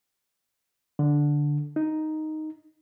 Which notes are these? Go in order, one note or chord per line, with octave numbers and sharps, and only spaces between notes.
D3
D#4